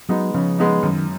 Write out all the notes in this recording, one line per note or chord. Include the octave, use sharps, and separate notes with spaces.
F#3 G#3 B3 D#4
C#3 F3
G#3 B3 D#4
F#2 D#3